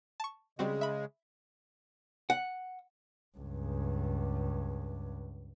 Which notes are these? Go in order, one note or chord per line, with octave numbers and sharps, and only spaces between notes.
A5 C#6
C#3 G3 G#3 C4 F#4
E5 B5
F#5
C#2 G2